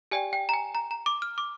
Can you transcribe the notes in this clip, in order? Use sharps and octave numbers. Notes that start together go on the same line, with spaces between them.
G4 D5 G5 G#5
G5
A#5
G#5
A#5
A#5
D6
F6
D6